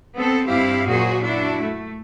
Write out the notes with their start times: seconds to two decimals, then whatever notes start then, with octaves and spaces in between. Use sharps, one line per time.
0.16 B3 C4 A4
0.48 G2 C4 E4 G4 F5
0.88 F#2 A#2 F#4 G#4 C5
1.24 D4 E4 F#4
1.62 A3